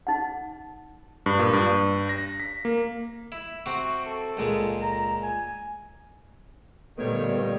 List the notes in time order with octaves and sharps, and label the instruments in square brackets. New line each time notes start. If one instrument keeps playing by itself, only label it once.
[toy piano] D#4 F#5
[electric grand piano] G2
A#2
G2
A#6
B6
A#3
[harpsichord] E4
[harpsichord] C3 C4 F#4 [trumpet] C#6
[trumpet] A4
[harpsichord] C#2 A#2 G#3
[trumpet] A#5
G#5
[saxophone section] G2 D#3 C#5 [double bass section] A#2 D3 G3 [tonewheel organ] A3 B3